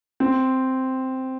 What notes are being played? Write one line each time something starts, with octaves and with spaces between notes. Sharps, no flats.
C4